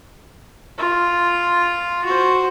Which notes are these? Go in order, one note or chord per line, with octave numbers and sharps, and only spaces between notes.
F4
F#4 C5